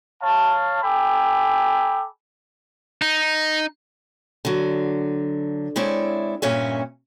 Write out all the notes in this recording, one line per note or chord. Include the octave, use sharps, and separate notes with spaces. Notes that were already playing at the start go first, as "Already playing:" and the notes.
C#5 F5 A5
A4 G5 G#5 B5 D6
D#4
D3 F#3
G#3 C4 E4 C#5 D5 E5
G2 A#2 C#4 C#5 E5 G#5